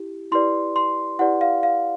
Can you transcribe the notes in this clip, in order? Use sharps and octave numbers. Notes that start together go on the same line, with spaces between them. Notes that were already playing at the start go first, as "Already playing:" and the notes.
Already playing: E4 G4
E4 G4 B4 D5 C6
C6
E4 G4 B4 D5 F#5
F5
F5